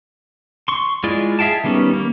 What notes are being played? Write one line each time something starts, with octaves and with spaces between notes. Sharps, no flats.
C6 C#6
G#3 E4 F4 G#4 D5
G#4 E5 F5 G5 A5
D#3 G3 B3 C#4
A#3